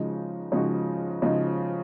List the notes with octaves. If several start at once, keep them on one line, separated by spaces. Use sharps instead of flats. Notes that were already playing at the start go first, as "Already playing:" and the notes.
Already playing: C#3 F3 G#3 D#4 F#4
C#3 F3 G#3 D#4 F#4
C#3 F3 G#3 D#4 F#4